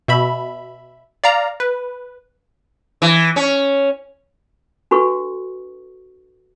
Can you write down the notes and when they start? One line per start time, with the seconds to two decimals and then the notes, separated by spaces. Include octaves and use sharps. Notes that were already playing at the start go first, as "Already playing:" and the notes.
0.08 B2 E5 B5
1.24 D5 F5 A#5
1.60 B4
3.02 E3
3.36 C#4
4.91 D4 F#4 A4 B4 C#6